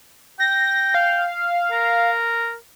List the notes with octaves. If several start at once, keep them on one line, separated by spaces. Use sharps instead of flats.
G5 A#6
F5
A#4